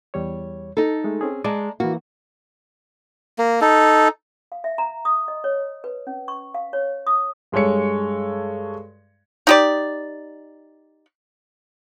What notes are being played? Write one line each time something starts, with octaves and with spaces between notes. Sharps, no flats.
E2 G3 C#5
D#4 A4
G#3 A3
C4 C#4 G#4
G#3 D5 A5 A#5
E3 A#3 F#4
A#3
D#4 A4
F5
E5
A#5
D#6
D#5
C#5
B4
C#4
C#6
F5
C#5
D#6
G2 G#3 A4 C#5 C#7
D#4 G4 D5